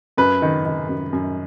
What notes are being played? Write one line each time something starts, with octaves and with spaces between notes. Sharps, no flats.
F#2 B4
D#3
D#3
F#2
F#2